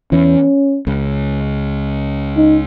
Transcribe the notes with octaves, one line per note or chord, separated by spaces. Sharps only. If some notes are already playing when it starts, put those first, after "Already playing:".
E2 E3 C#4
C#2 C#3
D#4